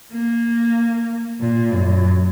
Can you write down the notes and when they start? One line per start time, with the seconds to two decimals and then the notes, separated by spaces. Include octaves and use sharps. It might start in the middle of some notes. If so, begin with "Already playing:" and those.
0.12 A#3
1.40 A#2
1.73 F#2